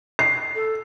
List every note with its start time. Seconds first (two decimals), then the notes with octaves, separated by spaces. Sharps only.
0.19 C7
0.55 A4